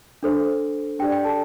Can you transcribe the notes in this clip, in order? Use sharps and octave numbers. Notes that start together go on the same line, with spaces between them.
D4 A4 C5
D4 G4 D5 G5
G5
A4 A5